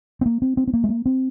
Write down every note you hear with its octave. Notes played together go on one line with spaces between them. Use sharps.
C4
A#3
C4
C4
C4
A#3
G#3
A#3
C4